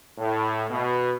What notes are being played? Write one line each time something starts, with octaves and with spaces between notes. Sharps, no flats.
A2
B2